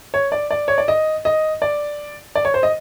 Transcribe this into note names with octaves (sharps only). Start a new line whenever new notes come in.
C#5
D5
D5
C#5
D5
D#5
D#5
D5
D5
C#5
C5
D#5